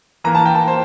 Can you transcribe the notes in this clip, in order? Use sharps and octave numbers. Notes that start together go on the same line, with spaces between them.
E3 A#3 A#5
A5
G5
A5
C5